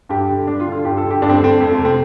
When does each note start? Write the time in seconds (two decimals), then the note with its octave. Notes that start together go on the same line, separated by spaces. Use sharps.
0.09 G2 G4
0.29 D3
0.47 G2 D4
0.60 F4
0.66 D3
0.72 F4
0.85 G2 G4
0.97 A4
1.03 D3
1.11 G4
1.22 G2 D4
1.29 C4
1.37 A3
1.42 D3 C4
1.60 F2 A3
1.73 A3
1.78 C3
1.85 C4